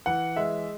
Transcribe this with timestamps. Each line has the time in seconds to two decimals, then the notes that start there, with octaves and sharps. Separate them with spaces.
0.06 E3 F#5
0.36 G#3 E5